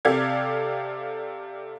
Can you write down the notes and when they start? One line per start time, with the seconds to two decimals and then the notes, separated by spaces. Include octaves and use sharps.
0.05 C3 G4 A4 D5 F5 G#6